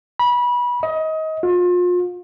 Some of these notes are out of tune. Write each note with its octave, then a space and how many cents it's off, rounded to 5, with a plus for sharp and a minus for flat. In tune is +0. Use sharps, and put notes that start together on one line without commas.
B5 -25
D#5 +25
F4 +35